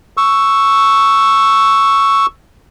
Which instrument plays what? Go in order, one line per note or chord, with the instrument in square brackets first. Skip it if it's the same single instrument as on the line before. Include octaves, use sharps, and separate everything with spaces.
[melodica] C#6 E6